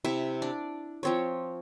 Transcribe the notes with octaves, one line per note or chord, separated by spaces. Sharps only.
C3 E4 E5
D4 D5
F3 C4 C#5